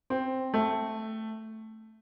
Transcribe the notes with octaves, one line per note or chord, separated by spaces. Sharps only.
C4
A3